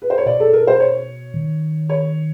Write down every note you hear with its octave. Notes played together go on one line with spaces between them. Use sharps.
B4
C5
C#5
B2 D5
A4
A#4
C5
C#5
D#3
C#5